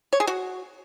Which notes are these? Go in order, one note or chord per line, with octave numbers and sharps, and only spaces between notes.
C#5
G#4
F#4